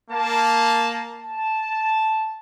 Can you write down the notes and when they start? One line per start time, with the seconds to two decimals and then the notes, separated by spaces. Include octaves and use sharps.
0.11 A#3 A5
1.21 A5